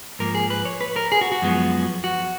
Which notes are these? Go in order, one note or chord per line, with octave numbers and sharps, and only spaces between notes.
G#2 F3 A#3 A#4
G#4
B4
C#5
B4
A#4
G#4
F#4
F#4
F#2 F3 G#3 B3
F#4